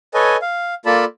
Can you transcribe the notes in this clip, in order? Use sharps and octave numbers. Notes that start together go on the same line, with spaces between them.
A4 B4 C#5 D#5 G#5
F5
A#3 F4 A4 D5 A5 B5